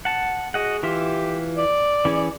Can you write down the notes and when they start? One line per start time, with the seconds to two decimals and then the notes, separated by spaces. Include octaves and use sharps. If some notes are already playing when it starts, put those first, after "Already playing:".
0.05 F#5 A5
0.54 F#4 G#4 D#5 F#5
0.83 E3 F4 G4 E5
1.57 D5
2.05 E3 C#4 G#4